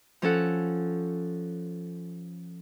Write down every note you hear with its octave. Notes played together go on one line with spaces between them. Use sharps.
F3 C#4 A4 F#5